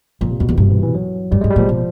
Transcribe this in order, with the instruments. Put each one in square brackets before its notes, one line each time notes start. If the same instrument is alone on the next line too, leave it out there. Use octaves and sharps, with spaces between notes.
[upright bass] F2 [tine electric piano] A#2
[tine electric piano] C3
[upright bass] F2 [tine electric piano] B2
[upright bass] E2
[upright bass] G2 [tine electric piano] C3
[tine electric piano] E3
E3
F#3
[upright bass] G2 [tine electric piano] G3
[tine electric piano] G#3
[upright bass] G#2
[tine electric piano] G3
[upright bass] A#2
[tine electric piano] F3
[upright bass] B2